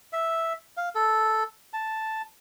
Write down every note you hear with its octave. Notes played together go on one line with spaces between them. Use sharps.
E5
F5
A4
A5